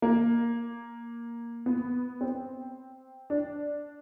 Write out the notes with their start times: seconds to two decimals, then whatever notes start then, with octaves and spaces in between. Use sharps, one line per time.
0.02 A#3
1.66 B3
2.21 C4
3.30 D4